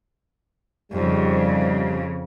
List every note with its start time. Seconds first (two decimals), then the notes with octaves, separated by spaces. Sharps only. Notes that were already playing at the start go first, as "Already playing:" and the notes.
0.92 F2 G#2 C#3 G3 G4